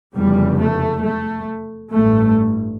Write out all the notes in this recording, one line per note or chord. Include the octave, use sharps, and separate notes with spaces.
F1 E2 C#3 G3
A3
A3
A1 G2 A3